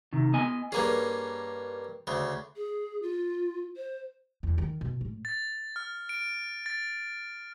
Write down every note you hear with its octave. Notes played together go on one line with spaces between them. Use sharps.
C3 D#3
B3 D#5 G#5
G2 A#3 C#4 G#4
D2 C#3
G#4
F4
C5
E2
D#3
B2
A2
A6
F6
D7
A6